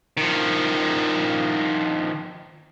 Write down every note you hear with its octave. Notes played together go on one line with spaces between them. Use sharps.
D#3 F3